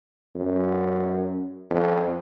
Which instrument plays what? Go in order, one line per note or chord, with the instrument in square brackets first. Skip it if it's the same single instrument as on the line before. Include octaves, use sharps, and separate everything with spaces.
[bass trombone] F#2
F2